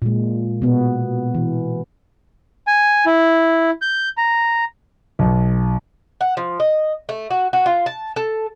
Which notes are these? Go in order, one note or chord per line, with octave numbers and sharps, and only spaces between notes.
A#2 G#3
B2 B3
E3
G#5
E4
G6
A#5
B1
F#5
F3
D#5
A3
F#4
F#4
F4
A5
A4